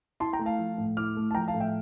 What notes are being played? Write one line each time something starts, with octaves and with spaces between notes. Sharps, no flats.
E4 A5 C6
G5 A#5
A3
F5 A5
F3
A2
E4 D6 F6
A3
A5
F3 G5 A#5
F5 A5
A2
E5 G5